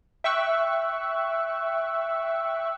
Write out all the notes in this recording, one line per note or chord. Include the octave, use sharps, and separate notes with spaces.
E5 G5 C#6 E6 F#6